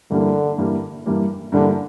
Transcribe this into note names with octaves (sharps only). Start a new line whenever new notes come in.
G2 D3 E3 G3 A#3
G2 E3 G3 A#3
G2 E3 G3 A#3
G2 D3 E3 G3 A#3